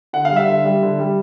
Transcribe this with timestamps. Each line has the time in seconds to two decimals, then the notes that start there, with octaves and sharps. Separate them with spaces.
0.13 D3 F#5
0.25 F5
0.30 G3
0.36 E5
0.48 D3
0.64 G3
0.82 D3
0.99 G3